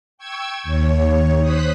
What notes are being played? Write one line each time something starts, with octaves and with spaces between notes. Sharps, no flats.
G5 C#6 E6 G#6
D#2 C#5
C5 D#6 F#6 B6